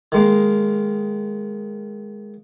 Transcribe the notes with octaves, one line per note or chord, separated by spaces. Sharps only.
D#3 G#3 A#3